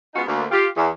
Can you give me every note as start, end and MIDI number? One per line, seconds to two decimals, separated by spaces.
0.15 0.23 56
0.15 0.23 59
0.15 0.23 61
0.15 0.23 63
0.15 0.23 65
0.15 0.23 66
0.27 0.46 38
0.27 0.46 58
0.51 0.67 65
0.51 0.67 67
0.77 0.89 40